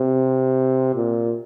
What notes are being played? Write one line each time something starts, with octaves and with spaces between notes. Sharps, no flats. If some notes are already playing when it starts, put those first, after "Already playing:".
Already playing: C3
A#2